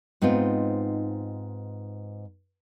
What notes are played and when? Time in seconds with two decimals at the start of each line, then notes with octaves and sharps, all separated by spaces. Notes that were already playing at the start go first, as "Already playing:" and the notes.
0.22 G#2 B3 C4 D#4 F4